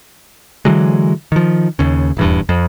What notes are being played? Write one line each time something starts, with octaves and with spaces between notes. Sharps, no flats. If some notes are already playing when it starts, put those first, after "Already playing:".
D3 E3 F#3 G#3
D#3 F3
D#2 C#3
D#1 E2 G2
F2